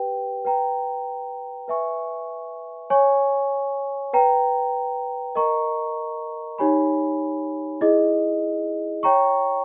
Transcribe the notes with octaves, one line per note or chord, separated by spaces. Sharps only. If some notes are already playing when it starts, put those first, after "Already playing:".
Already playing: G4 B4 G5
B4 G5 A#5
B4 E5 G#5 C#6
C#5 G#5 C#6
B4 G5 A#5
A#4 D#5 A#5 C#6
D#4 G4 C#5 G#5 B5
E4 G#4 D#5
C#5 G5 A#5 C#6